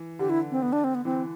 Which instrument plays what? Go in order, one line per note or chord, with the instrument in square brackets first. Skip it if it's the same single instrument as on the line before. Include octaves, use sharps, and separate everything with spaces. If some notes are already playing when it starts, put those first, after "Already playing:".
Already playing: [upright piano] E3
[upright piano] D3 [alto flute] G4
[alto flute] E4
C4
B3
D4
C4
B3
[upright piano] E3 [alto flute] C4